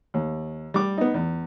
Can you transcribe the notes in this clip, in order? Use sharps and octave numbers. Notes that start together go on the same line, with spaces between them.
D#2
G3 D6
B3 D#4
E2